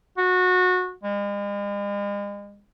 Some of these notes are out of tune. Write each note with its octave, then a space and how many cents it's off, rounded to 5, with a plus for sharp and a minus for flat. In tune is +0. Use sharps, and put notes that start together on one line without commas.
F#4 -20
G#3 -40